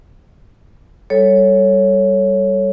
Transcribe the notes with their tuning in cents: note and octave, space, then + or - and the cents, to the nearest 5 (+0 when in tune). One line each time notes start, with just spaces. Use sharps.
G3 +0 A4 +0 C#5 +0